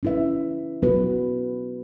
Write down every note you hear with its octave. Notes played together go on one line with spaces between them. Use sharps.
C#4 E4 B4 E5
F#3 B3 F#4 B4